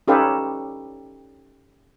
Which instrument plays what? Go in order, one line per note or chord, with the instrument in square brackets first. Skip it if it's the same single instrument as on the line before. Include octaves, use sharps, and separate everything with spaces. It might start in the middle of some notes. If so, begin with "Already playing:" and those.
[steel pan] C#4 D#4 G4 A4 B4 F5